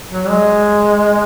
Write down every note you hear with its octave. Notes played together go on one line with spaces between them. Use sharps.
F#3
G#3